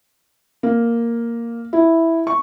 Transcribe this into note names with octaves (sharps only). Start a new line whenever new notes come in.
A#3
E4
C#6